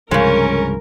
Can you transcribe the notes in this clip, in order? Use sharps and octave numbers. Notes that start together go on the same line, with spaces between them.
C2 G2 C#3 F3 G#3 C#4 A#4